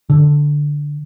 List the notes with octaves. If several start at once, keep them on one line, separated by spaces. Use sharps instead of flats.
D3